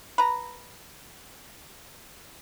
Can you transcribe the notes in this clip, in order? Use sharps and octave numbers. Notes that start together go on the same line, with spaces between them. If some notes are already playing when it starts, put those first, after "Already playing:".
B4 A#5